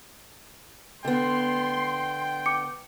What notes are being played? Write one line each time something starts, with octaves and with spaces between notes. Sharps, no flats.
D3 B3 G5 C6
D6 C#7